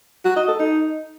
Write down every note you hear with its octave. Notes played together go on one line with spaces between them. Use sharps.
F#4
D#5
A4
D#4